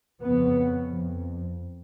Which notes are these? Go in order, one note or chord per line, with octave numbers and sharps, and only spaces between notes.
F2 C#3 B3
F2